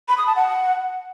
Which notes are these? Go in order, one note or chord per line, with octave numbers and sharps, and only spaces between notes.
B5
D#6
A5
F#5